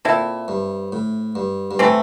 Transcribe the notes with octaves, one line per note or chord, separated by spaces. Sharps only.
A#2 C4 E4 A4 E5
G2
A2
G2
G2
A2 E3 A3 C4